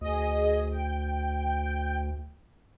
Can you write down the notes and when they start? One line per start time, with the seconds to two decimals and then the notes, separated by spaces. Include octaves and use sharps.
0.01 D2 G#4 D#5
0.71 G5